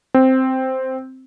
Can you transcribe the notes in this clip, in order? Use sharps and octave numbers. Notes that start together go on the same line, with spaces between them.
C4